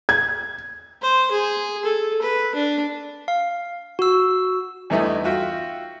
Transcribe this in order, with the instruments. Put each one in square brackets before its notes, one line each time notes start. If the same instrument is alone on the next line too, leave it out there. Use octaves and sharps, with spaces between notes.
[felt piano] G#6
[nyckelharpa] C5
G#4
A4
B4
D4
[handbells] F5
F#4 E6
[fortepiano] E2 G2 A3 B3 D#4 E4
F4 F#4 E5 G5